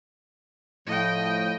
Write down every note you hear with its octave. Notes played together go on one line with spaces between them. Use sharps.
A2 F3 D#5 G5